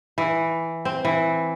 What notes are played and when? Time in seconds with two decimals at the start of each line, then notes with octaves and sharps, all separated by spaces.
0.18 E3
0.85 C4
1.05 E3